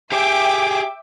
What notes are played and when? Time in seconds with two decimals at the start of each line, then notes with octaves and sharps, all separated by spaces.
0.12 G4 G#4 E5 G5 D6